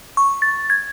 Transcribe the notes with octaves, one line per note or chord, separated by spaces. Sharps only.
C#6
A6
G#6